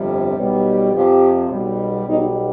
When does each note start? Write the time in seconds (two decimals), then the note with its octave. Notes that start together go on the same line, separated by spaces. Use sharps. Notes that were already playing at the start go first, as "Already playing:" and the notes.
Already playing: G1 F2 C3 G3
0.36 B1 B2 G3
0.93 F2 C3 F3 G4
1.50 B1 B2 G3
2.06 B1 B2 G3 D#4